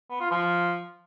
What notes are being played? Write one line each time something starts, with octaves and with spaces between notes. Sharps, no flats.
B3
F4
F3